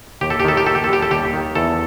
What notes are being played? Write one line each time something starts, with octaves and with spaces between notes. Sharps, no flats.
D#2 G4
A4
G4
D#3 A4
G4
D#2 A4
G4
A4
G3 G4
A4
D#2 G4
D#3
E2 A4